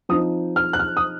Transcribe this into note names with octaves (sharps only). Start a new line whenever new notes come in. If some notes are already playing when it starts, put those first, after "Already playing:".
F3 C4 D#4 D#6
F6
F#6
F6
D#6